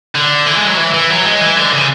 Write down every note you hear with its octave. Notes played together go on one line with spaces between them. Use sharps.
D3
E3
G#3
F#3
E3
E3
F#3
G#3
E3
D3
C#3